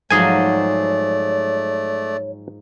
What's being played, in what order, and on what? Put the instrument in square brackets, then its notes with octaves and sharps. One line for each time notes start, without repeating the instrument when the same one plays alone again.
[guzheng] G#2 F3 F#3 [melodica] A3 D5 [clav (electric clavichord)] G#4 G#5 [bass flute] C#5